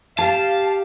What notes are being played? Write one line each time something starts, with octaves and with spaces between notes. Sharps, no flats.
G4 F5 A5